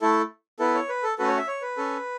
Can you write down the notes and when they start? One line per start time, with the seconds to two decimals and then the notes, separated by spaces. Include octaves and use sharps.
0.01 A3 E4 A4
0.59 B3 E4 A4 B4
0.75 C#5
0.89 B4
1.03 A4
1.18 A3 C#4 F#4 A4 B4
1.28 C#5
1.37 E5
1.47 C#5
1.62 B4
1.77 C#4 A4